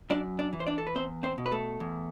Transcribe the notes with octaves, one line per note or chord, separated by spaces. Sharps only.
F#2 D4 D5
D4 D5
E3
C5
D4 D5
A4
B4
E2 C4 C5
C4 C5
B2
B4
A3 A4
E2